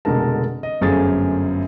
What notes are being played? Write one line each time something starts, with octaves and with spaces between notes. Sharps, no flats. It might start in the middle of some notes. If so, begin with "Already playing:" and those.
F1 B2 D3 G#3 A#4 A5
D#5
G1 F#2 A3 C4 G#4 A6